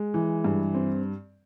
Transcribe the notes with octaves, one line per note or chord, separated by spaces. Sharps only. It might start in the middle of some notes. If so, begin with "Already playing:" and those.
Already playing: G#3
E3
G2
C4